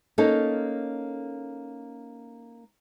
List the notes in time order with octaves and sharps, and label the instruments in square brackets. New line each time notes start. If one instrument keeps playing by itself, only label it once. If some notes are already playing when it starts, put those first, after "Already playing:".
[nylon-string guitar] A#3 C#4 D#4 A4